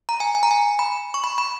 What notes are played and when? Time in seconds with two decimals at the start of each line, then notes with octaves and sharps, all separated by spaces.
0.09 A#5
0.20 G#5
0.35 G#5
0.43 A#5
0.51 G#5
0.79 B5
1.14 C#6
1.24 B5
1.38 B5